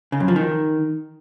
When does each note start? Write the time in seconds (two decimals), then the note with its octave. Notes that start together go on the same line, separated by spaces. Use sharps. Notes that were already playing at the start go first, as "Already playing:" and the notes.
0.12 C#3
0.20 F#2
0.28 F3
0.36 D#3